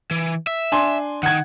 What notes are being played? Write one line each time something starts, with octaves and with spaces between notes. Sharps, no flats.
E3
E5
D4 G#5 C6
D#3 F#5 G#6